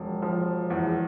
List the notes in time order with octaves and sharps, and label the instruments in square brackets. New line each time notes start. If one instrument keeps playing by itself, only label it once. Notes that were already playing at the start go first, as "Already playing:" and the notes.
Already playing: [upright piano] E1 F3
F3
E2